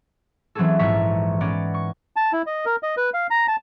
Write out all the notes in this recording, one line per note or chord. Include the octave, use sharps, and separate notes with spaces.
E3 F#3 C4 C#4 G#4 A4
A#1 G#2 A4 A#5 C#6 B6
B3 C#4 A#4 D5
C#6
A5
E4
D#5
A#4
D#5
B4
F5
A#5
A5